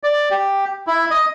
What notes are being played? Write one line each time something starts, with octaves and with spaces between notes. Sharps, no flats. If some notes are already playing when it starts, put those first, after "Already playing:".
D5
G4
E4
D#5